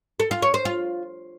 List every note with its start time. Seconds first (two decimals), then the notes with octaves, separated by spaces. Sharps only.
0.20 A4
0.31 F4
0.42 C#5
0.54 C5
0.65 F4